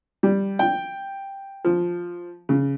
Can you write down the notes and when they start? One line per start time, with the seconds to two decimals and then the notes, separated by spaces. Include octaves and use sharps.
0.23 G3
0.59 G5
1.65 F3
2.49 C#3